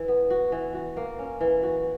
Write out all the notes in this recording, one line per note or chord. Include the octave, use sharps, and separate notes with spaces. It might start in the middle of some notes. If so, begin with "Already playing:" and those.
Already playing: E3
B3
F#4
E3
F#4
A#3
C#4
E3
F#4